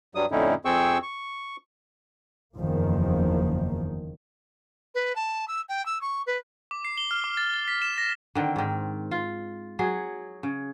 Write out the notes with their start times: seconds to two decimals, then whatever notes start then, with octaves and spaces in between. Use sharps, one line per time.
0.15 G2 F#3 G3 D#6
0.31 F2 A2 D3 C#4 D#4 E4
0.65 F2 C4 G#4 G5 C#6 E6
1.02 C#6
2.57 F#1 E2 D#3 F3 A#3
4.94 B4
5.15 A5
5.48 E6
5.69 G5
5.85 E6
6.01 C#6
6.26 B4
6.71 D6
6.85 C7
6.98 G7
7.11 F6
7.24 D6
7.37 A6
7.54 A6
7.68 B6
7.82 E7
7.98 A#6
8.35 D3 D#3 C4
8.56 G#2 D#3
9.11 F4
9.79 F#3 G#4
10.43 C#3